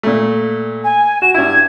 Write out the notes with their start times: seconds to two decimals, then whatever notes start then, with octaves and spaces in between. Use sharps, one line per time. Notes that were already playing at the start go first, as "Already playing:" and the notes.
0.03 A#2 A3
0.84 G#5
1.22 F#4 E7
1.34 G2 E4 G#6